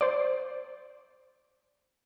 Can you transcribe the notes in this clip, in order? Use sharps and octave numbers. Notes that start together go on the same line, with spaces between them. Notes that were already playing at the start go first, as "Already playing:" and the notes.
C5 D5